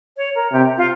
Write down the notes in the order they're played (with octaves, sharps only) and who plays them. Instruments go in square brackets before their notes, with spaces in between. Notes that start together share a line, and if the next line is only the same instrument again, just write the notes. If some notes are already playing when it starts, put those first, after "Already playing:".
[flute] C#5
A#4
[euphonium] C3 [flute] G4
[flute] F4